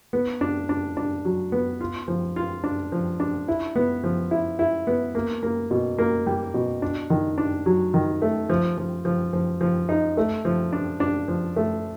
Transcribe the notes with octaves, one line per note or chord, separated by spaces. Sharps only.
B3
D4
D4
D4
F#3
B3
F4
F3
F4
D4
F3
D4
E4
B3
F3
E4
E4
B3
A#3
A#3
B2
A#3
G3
B2
D4
D#3
D4
F#3
D#3
A3
F3
F3
F3
F3
F3
D#4
A3
F3
D4
D4
F3
A3